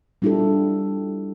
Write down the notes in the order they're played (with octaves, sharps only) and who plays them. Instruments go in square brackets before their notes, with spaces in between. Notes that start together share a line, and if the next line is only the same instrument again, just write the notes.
[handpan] G3 D4 E4 F4 G4 A4